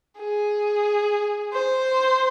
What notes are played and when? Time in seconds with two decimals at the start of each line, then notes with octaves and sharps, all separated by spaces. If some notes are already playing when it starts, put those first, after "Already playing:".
0.19 G#4
1.53 C5